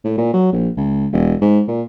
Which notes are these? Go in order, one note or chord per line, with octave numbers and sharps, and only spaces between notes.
A2
A#2
F#3
A#1
C#2
E1
G#2
A#2